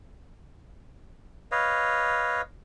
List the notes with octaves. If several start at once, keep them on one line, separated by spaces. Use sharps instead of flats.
B4 C#5 D#5 F5